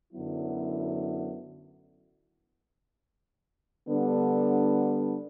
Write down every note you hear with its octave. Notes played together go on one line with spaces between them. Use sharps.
F#2 D3 F#3 B3 E4
D3 G3 B3 D4